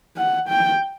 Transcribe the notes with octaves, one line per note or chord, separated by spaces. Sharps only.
F#5
G5